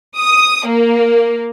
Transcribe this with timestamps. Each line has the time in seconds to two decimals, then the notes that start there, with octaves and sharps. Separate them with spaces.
0.17 D#6
0.67 A#3